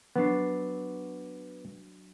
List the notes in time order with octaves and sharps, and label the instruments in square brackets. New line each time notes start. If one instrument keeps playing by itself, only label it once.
[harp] F#3 D4 C7 [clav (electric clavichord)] B3